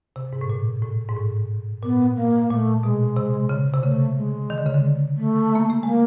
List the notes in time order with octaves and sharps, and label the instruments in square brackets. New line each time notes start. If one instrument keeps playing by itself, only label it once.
[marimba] C3
G#2
A2
A#2
A2
G#2
A2
[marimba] A#2 [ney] B3
[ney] A#3
[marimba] A#2 [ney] A3
[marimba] B2 [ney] G#3
[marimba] C3
C#3
C3
[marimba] C#3 [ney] A3
[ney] G#3
[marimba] D#3
D3
C#3
D3
[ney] A3
[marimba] A#3
A3
[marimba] G#3 [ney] A#3